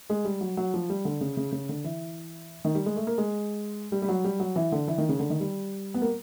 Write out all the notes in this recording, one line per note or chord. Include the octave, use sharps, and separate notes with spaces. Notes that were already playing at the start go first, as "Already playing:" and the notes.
G#3
G3
F#3
F#3
F3
G3
D3
C#3
C#3
C#3
D3
E3
D#3
G3
G#3
A3
A#3
G#3
G3
G3
F#3
G3
F#3
E3
D3
E3
D#3
C#3
D3
D#3
G3
B3
A#3